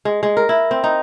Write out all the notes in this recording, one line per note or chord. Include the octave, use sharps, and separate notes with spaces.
G#3
G#3
A#4
E4
C4
D#4